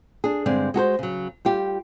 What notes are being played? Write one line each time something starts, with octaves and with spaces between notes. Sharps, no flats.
D4 G#4
G2 D3 G#3 C4 D5
G#3 F#4 A4 C5
C#3 F#3
G3 F4 G4